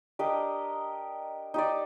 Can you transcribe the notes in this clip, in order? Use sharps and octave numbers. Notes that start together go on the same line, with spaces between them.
D4 G4 A#4 D#5
D#4 G4 D5